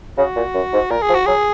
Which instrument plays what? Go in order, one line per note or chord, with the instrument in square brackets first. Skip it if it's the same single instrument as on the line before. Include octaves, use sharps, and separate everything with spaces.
[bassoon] C#3 [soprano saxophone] F#4
[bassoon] A#2
F#2
G#2
[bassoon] A#2 [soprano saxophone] A#4
[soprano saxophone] G#4
[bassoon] F3
[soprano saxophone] F#4
[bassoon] F#3 [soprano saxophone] G#4